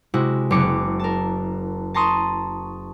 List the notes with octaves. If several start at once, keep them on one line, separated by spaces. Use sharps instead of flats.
C3 G#3 E4 F#4
F#1 B3 D6 C#7
A#4 A5
A5 A#5 C6 C#6 D#6